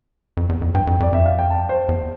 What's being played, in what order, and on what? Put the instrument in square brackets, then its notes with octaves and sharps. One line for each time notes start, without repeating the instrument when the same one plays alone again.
[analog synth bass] F2
E2
F2
[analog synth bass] G2 [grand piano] G5
[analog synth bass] F2
[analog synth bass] F2 [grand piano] D5
[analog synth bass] F2 [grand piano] E5
[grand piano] F5
G5
A5
C5
[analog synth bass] E2